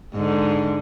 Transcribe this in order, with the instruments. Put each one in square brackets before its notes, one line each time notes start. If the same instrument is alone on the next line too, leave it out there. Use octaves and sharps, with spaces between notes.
[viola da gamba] G#2 D3